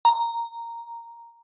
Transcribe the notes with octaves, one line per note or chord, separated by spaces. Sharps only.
A#5